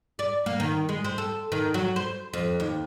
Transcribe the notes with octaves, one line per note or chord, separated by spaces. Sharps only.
D5
A#3
D#3
G#3
C4
A4
D#3
F#3
C5
F2
D#2